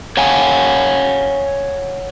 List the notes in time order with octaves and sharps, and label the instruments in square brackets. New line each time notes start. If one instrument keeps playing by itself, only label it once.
[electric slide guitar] C#5 F5 F#5 G#5